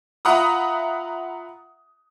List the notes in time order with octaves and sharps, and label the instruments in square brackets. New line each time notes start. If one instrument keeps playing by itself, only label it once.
[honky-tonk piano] F4 E5 F#5 A#5 B5 D#6